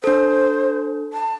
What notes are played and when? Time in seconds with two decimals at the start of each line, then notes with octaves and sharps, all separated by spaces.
0.04 D4 A4 C5
1.13 A5